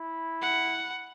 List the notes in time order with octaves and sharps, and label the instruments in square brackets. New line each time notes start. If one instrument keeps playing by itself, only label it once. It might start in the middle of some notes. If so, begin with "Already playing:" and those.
Already playing: [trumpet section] E4
[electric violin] F#5